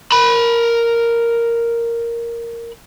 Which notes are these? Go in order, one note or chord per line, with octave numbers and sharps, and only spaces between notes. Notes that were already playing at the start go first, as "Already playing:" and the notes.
A#4 B5